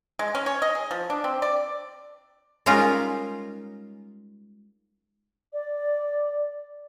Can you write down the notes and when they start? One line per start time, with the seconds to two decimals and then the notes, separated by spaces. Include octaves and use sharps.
0.19 G#3
0.35 C#4
0.46 C#5
0.62 D#5
0.75 G#4
0.91 F3
1.10 D4
1.24 C4
1.42 D5
2.66 G3 G#3 C#4 D#4 F4 A#4
5.53 D5